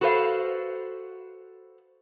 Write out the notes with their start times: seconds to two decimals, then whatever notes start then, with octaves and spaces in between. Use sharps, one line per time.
0.01 F#4 A4 B4 C5 F5